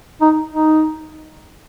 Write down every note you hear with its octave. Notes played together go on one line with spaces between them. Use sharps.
D#4
D#4